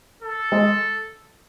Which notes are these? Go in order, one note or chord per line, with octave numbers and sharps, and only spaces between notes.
A4
G#3